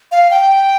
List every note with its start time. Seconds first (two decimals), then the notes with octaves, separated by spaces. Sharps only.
0.12 F5
0.31 G5